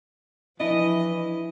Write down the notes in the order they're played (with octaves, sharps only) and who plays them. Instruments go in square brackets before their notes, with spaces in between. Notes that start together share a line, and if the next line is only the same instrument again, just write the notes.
[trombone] E3 [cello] F3 [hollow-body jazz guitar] D4 E4 [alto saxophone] D#5